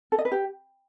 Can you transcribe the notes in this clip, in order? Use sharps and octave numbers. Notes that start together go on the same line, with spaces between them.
A4
D#5
B4
G4